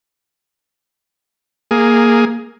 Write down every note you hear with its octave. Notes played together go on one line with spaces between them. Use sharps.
A#3 G#4